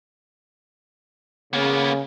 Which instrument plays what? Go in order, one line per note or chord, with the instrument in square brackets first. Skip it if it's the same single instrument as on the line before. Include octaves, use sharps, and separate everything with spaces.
[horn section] C#3 [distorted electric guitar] A#3 B3